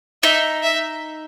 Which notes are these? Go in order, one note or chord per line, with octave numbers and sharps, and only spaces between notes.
D#4 E5
E5